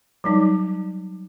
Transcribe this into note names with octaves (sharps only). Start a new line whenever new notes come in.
F#3 G3 D#4